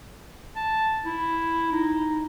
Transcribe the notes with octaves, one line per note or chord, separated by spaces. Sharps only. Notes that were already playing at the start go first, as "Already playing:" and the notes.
A5
E4
D#4